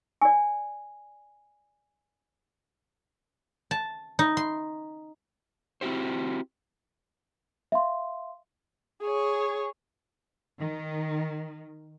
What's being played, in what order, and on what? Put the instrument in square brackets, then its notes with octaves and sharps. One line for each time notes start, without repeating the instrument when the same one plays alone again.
[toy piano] D5 G#5
[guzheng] A5
D#4
C6
[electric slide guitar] C4 E4 F#4 G4 C5
[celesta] E5 F5 C6
[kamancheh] G#4 C#5
[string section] D#3